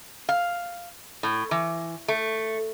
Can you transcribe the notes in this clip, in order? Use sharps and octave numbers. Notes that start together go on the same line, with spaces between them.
F5
A2
E3
A3